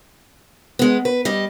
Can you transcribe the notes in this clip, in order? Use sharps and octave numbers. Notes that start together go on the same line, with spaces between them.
G#3 B3
B4
G3 D#5